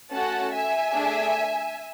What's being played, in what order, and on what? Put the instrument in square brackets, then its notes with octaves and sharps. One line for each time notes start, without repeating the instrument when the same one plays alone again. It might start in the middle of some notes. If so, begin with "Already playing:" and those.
[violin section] A3 C#4 F#4 A4 F#5 A5
E5 G#5
A3 D4 G#4